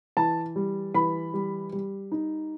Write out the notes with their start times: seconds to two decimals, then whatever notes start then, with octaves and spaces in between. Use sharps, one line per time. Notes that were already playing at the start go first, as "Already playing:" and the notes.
0.17 E3 A5
0.56 G3
0.94 E3 B5
1.34 G3
1.73 G3
2.12 D#4